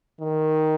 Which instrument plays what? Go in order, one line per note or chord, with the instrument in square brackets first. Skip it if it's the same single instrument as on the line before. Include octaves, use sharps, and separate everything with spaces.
[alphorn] D#3